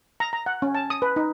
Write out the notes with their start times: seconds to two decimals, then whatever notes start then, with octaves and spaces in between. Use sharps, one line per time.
0.20 A#5
0.33 A#5
0.46 F#5
0.62 C#4
0.75 A5
0.90 D#6
1.02 B4
1.16 D#4